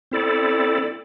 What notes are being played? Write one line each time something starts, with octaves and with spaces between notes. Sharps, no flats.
C4 E4 A4 D5